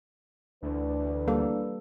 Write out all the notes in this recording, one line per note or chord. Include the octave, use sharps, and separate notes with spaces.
D2 E3 D4 B4
G3 A#3 A4